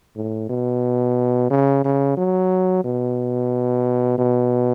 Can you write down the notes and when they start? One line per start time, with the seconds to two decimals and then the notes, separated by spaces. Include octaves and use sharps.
0.16 A2
0.50 B2
1.50 C#3
1.85 C#3
2.17 F#3
2.84 B2
4.18 B2